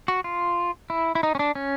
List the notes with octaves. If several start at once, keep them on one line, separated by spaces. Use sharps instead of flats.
F#4
F4
E4
E4
D#4
C#4
D4
C#4